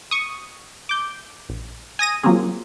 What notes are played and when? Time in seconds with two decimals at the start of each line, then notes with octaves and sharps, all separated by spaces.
0.11 C#6 D#6
0.89 D6 G6
1.49 A#1
1.99 G#5 D#6 A#6 D#7
2.23 F3 F#3 A#3 C4 C#4 G#4